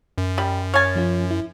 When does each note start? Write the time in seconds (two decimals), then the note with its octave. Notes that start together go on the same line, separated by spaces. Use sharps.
0.18 F#2
0.38 G3
0.74 C#5 G#5 F6 A6
0.95 F3 C#4 F4
1.31 E4